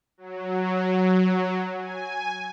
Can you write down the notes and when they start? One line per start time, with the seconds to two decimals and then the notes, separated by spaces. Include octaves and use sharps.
0.18 F#3
1.76 G#5